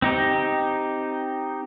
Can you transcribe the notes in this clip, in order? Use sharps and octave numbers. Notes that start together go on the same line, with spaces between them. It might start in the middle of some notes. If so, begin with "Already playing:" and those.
C4 D#4 G4